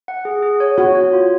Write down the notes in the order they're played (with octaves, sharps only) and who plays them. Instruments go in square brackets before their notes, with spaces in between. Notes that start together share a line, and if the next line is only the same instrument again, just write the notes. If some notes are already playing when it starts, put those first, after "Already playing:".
[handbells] F#5
G#4
G#4
C#5
[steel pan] F#4 [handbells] C#5
[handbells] C#5
F4